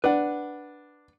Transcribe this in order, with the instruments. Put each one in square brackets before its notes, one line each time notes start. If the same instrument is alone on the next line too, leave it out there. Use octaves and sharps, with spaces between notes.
[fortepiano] D4 [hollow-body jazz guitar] B4 F#5